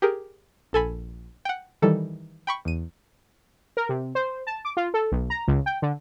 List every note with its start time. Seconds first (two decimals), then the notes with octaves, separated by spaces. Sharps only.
0.02 G4 G#4 A#4
0.73 A#1 A4 G#5 B5
1.45 F#5 G5
1.82 D#3 E3 G3 A4
2.47 G5 B5 C#6
2.65 E2 D#7
3.77 A#4
3.89 C3
4.15 C5
4.47 A5
4.65 D6
4.77 F4
4.94 A4
5.12 B1
5.30 A#5
5.48 C#2
5.66 G5
5.82 D3